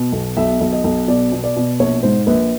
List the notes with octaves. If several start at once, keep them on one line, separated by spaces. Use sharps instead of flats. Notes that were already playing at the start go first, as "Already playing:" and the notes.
Already playing: B2
B1
B1 E5
B1
D#5
B1
B2 D5
B2
D5
B2
A#1 C#5
G#2 C5
A#1 B4